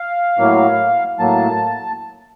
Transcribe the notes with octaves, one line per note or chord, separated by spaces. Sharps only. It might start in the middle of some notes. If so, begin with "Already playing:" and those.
Already playing: F5
A2 F#3 A#3
A2 F#3 A#3 A5